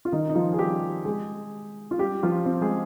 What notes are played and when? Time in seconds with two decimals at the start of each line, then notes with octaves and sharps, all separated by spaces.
0.05 F4
0.12 D#3 D#4
0.29 D#4
0.35 F3 F4
0.53 G#4
0.58 G3 G4
1.05 G#3 G#4
1.91 F4
1.99 G3 G4
2.23 F3 F4
2.46 C4
2.61 G#3 G#4